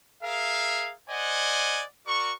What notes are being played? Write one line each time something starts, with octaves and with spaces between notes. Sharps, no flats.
G#4 A#4 E5 F5
C5 D5 D#5 F#5 G#5
F#4 A#4 D5 C#6